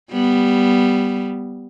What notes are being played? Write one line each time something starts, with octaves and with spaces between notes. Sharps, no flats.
G3 B3